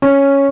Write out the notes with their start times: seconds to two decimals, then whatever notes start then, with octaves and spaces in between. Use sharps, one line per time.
0.02 C#4